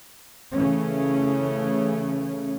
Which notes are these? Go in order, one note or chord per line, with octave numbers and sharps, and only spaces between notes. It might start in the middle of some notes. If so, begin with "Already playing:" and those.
C#3 E3 A3 C#4